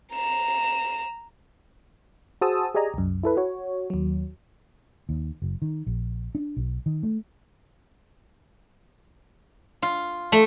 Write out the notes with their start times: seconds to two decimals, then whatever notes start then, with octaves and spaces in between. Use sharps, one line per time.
0.14 A#5 E7
2.41 F#4 G#4 C5 A5 D#6 E6
2.74 G4 G#4 D5 D#5 G#5 A#5
2.94 C2 F#2
3.23 E4 A4 B4
3.37 F#4 C#5
3.90 D#2 F#3
5.09 D#2
5.42 F#1
5.62 D#3
5.87 A#1
6.35 D4
6.57 B1
6.86 D#3
7.03 A3
9.82 F4
10.32 A3